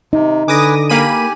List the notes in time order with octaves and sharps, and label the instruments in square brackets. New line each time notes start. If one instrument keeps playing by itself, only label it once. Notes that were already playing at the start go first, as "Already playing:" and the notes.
[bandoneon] C3 [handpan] D#4
[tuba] D3 [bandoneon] B4 G#5 [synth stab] D6 D#6 A#6
[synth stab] A#3 B5 D#7 [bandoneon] G4 G#5